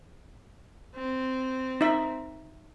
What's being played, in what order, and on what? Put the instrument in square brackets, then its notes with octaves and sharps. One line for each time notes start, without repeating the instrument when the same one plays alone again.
[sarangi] C4
[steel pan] D#4 E5